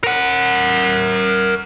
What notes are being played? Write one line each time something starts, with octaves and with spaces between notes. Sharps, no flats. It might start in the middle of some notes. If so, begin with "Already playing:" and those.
A#4 F#5